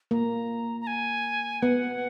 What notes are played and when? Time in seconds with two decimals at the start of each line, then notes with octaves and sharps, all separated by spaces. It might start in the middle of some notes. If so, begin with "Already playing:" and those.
0.11 A#3 A#5
0.81 A#5
0.87 G#5
1.62 B3 F#5